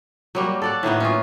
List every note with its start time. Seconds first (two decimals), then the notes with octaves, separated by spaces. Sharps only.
0.35 F#3 G3 A#3
0.62 A4 D5 F#5
0.83 A2 D#3 A#3 B3
1.00 C#4 D#4 F4